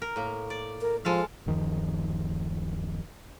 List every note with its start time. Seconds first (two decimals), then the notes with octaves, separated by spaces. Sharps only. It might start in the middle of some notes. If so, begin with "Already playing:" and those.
0.02 A#4
0.16 A2 A#3
0.50 D5
0.81 A#4
1.05 F3 G#3 A4 F5
1.46 D1 F#2 D#3 F3